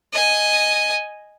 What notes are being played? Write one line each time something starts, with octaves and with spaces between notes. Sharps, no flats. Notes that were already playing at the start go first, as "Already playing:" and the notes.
D#5 G#5